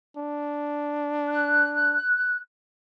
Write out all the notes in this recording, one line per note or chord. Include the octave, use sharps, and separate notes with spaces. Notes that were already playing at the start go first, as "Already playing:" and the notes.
D4
F#6